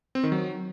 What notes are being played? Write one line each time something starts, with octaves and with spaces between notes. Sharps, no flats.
C4
D#3
F#3